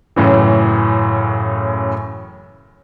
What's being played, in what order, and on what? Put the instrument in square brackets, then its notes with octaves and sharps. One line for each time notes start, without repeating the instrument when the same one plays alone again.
[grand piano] F#2 A2 C#3 E3